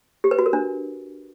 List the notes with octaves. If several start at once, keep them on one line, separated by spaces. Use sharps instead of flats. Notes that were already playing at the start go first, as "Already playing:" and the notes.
G4
B4
F#4
A#4
D4